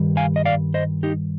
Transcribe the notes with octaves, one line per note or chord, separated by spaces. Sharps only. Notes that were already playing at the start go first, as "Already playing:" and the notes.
Already playing: G2 D#3 G3
F5 G#5
D#5
D5 F5
C5 D#5
D#4 G4